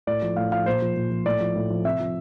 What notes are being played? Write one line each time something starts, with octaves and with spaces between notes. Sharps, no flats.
A2 D5
F3
A2 F5
F3 F5
A#2 C5
F3
A#2
F3
A2 D5
F3
A2
F3
C3 E5
F3